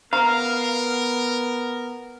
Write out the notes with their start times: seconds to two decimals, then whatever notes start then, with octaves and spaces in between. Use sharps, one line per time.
0.13 B3 A#4 F5 A#5